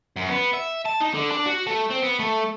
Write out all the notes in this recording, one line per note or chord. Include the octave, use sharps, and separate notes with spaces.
F#2
B3
E5
A5
D#4
D3
D4
F#4
A3
C4
B3
A3